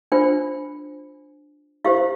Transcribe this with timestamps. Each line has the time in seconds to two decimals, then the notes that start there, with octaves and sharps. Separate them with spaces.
0.12 D4 F4 C5 G5
1.84 E4 G4 C5 F5